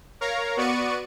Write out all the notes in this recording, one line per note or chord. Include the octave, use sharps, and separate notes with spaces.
A#4 C#5 F5 A#5
B3 F#4 D5 C#6 C#7 D#7